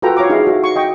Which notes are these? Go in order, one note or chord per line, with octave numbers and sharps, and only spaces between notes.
F4 F#4 A4 B4 G5 A#5
C#5 F5 A#5 D6
D#4 E4 G#4 F5
F#4
C#6
D#5 G5 C#6